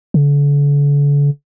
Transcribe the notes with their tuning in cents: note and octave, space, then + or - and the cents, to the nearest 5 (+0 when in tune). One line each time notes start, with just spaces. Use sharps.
D3 -40